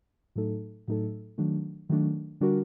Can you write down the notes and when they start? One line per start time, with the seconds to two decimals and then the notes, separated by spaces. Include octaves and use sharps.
0.36 A2 F#3 A3 D#4 A4
0.88 A2 F#3 A3 D#4 A4
1.38 D#3 F#3 A3 D4
1.89 D#3 F#3 A3 D4
2.40 D3 G3 D4 F#4 A#4